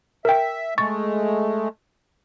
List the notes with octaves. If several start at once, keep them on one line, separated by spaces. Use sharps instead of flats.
A#4 E5 G5
G#3 A3 C#6 A6